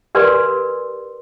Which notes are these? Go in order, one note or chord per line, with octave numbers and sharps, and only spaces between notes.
G4 A#4 B4 D5 G#5 C6